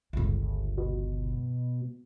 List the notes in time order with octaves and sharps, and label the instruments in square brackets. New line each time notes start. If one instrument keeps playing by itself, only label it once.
[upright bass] G1 C#2
[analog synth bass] B2